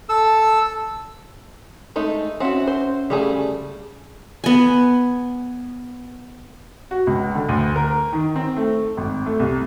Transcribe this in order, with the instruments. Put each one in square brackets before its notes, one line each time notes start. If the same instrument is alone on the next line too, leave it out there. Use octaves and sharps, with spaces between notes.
[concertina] A4 E6
[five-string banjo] G#3 A3 D#4
[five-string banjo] C4 F#4 [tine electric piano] C#4 E5 F#5
[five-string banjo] C5
[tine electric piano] C#3 [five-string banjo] G3 A3 G#4
[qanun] B3 G#5
[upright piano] F#4
C#2
D3
D2
A#4
D#3
C4
A3
G#1
A3
C2